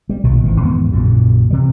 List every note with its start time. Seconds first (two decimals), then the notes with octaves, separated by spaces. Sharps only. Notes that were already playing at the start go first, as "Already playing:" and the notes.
0.09 G3
0.24 B1 A#2 D#3
0.44 G#1 E3 F3
0.62 E2 G#2 D#3 B3
0.91 A#1 F#2 A#2 C#3
1.50 C3 E3 G3